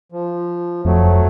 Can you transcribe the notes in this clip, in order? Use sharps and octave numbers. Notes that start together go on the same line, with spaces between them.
F3
F1 F#3 A3